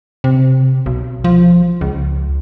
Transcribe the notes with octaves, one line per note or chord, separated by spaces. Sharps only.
C3
B1
F3
C#2